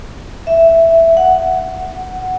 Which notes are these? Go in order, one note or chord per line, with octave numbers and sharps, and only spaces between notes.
E5
F#5